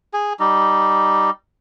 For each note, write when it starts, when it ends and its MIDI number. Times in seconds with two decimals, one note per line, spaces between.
0.13 0.33 68
0.40 1.30 55
0.40 1.30 63